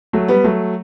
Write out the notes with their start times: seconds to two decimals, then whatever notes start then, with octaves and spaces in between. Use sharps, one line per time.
0.13 F#3 A3
0.28 G3 B3
0.44 F#3 A3